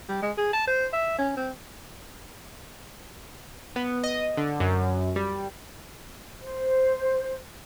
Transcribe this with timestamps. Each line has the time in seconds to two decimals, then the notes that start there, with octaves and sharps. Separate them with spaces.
0.09 G3
0.22 G#3
0.37 G#4
0.53 A5
0.67 C5
0.93 E5
1.18 C#4
1.37 C4
3.76 B3
4.04 D#5
4.37 D3
4.60 F#2
5.16 G3
6.42 C5